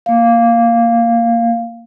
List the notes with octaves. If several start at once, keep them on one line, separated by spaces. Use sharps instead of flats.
A#3 F5